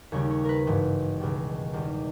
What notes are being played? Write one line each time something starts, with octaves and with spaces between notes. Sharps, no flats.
D#2 C#3 G3 C#5
C#5
A#4 B4
G#1 G2 E3
C#2 B2 G3
E2 D#3 G3